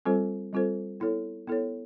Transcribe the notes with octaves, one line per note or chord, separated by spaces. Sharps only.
G3 C4 F4 A4 C5
G3 C4 F4 A4 C5
B3 E4 A4 C#5
B3 E4 A4 C#5